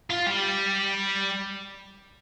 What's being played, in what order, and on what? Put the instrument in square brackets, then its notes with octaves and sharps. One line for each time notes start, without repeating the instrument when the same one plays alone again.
[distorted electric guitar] F4
G3